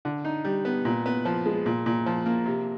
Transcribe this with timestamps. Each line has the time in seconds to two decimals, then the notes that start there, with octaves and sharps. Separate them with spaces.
0.05 D3
0.24 D#4
0.45 G3
0.65 B3
0.85 A#2
1.06 B3
1.25 F3
1.46 G#3
1.66 A#2
1.86 A#2
2.06 F3
2.26 A#3
2.46 C3